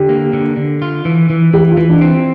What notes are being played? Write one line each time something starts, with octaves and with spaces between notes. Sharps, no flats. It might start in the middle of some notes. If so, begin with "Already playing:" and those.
Already playing: D3 G4
A#3
D3
D3
F4
E3
E3
E3 G4
F4
E3
D4
C4